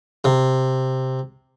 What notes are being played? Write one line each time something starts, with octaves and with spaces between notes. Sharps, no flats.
C3